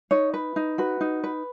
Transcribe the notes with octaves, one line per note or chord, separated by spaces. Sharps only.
D#4 C#5
B4
D#4
F#4 B4
D#4
B4